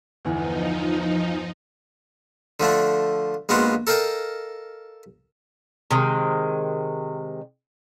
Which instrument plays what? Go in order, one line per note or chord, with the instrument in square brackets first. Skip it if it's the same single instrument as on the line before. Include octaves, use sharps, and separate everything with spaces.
[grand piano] G1 E2 E3 [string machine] F3 D#4
[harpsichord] D3 F3 A3 D4
A#1 G#3 B3 F4 F#4
A4 A#4 D#5 F5 G5 A5
[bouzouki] C3 D#3 G#3